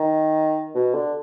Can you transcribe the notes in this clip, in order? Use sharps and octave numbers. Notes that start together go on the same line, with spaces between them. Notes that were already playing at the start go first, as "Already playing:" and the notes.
Already playing: D#3
B2
D3